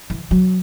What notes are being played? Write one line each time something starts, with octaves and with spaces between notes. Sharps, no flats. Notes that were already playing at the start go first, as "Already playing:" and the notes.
E3
F#3